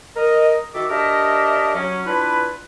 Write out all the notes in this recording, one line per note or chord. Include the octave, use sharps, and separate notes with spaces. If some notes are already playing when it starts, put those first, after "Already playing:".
A#4 D#5
D#3 F#4 A4 E5 D6
D4 G4 A4 A#4 D#5 E5
F#3 C#4
D4 E4 F4 B4